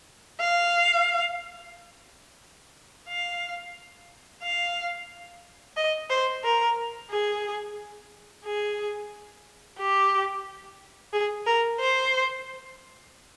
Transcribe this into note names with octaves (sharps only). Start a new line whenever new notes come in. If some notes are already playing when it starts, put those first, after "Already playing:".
F5
F5
F5
D#5
C5
A#4
G#4
G#4
G4
G#4
A#4
C5